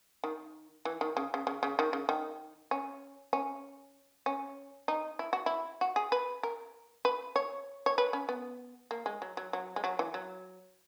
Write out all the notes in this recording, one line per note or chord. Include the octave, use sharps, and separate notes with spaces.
D#3
E3
D#3
C#3
C#3
C#3
C#3
D#3
C#3
D#3
C#4
C#4
C#4
D#4
E4
F#4
E4
F#4
G#4
B4
A#4
B4
C#5
C#5
B4
C#4
B3
A#3
G#3
F#3
F#3
F#3
G#3
F#3
E3
F#3